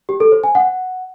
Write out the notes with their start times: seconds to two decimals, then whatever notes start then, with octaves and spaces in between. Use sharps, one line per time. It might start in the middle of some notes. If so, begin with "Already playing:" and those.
0.09 G4
0.20 A4
0.32 C5
0.44 G#5
0.55 F#5